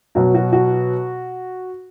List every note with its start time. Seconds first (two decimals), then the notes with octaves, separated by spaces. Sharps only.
0.15 B2 F#3 F#4
0.34 F#4
0.53 F#4